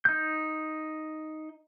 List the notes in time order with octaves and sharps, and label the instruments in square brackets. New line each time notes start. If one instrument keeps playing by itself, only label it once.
[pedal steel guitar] D#4 G6